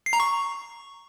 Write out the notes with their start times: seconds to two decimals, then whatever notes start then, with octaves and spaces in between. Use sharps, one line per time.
0.06 C7
0.13 A#5
0.20 C#6